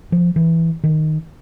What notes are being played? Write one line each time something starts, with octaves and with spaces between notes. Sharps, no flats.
F3
E3
D#3